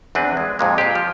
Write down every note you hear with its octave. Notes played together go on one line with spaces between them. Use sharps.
E2 C4 D4 B4
G#3
F2 A#2 G#3
G4 G#4
F3